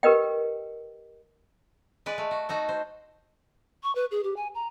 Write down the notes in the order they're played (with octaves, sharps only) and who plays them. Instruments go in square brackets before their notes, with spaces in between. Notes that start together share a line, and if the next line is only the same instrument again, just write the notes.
[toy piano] G4 A#4 B4 D#5 G5
[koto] G#3 B4 D5
A3
F#4
D#4 F#4 A4
C5
[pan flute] C#6
B4
G#4
G4
G#5
A#5